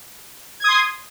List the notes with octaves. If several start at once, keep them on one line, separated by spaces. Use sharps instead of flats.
C6 D#6 G#6